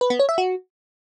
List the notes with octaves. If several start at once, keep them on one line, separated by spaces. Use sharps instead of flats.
B4
B3
C#5
E5
F#4